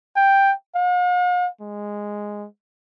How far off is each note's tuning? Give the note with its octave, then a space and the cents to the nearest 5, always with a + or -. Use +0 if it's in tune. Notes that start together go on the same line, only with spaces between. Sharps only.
G5 +5
F5 +45
G#3 -5